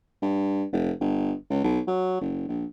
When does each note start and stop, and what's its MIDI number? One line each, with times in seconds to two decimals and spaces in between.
0.22 0.65 43
0.73 0.92 29
1.00 1.34 31
1.50 1.61 37
1.64 1.80 35
1.87 2.20 54
2.21 2.47 30
2.48 2.65 34